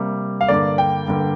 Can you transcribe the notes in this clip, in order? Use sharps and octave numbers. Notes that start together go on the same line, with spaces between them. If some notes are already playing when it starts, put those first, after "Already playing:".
Already playing: C3 G3 A#3
F5
G2 D3 A#3 D5
G5
G2 D3 A#3